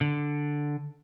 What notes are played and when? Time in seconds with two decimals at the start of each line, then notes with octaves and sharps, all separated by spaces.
0.01 D3